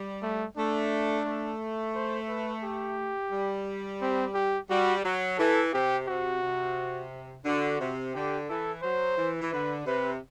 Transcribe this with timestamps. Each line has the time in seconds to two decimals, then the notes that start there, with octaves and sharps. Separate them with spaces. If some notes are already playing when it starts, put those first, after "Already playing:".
Already playing: G3
0.22 A3
0.57 A3 D4
1.25 A3
1.94 C5
2.28 B4
2.64 G4
3.32 G3
4.01 C4
4.35 G4
4.70 G3 F#4
5.04 F#3
5.38 E3 A4
5.73 C3 G4
6.08 C3 F#4
6.42 C3
7.45 D3 F#4
7.80 C3
8.14 D3 G4
8.48 E3 A4
8.82 F#3 C5
9.17 E3
9.42 E3
9.52 D3 B4
9.86 C3 B4